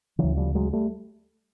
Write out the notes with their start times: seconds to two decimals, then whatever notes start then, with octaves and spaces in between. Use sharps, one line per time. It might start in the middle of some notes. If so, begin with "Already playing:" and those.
0.18 D2 C#3 E3 F#3
0.37 F3 G3
0.55 F#3 G#3
0.73 G3 A3